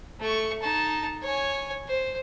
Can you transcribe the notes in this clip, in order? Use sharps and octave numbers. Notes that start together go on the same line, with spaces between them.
A3 C#6
D#4 A5
C#5 G#5
C5